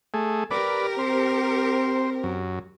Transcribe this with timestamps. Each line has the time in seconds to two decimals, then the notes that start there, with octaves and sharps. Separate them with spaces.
0.14 A3 G#4
0.51 G4 A#4 B4 D5
0.99 C4 C5
2.23 F#2